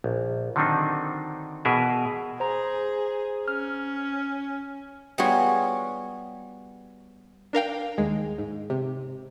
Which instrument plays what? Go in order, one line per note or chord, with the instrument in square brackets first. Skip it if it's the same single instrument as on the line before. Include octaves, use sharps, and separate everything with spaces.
[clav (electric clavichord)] A#1
D3 D#3 F#3 C4 D4 D#4
B2 E3 G#4 A#4 B4 E5
[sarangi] G#4 [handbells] C5 A#5
[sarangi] C#4 [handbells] F6
[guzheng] G3 B3 F4 F#4 G#4 C#5
[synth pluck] D4 A#4 F5 G5
D#2 G#3
G#2
C3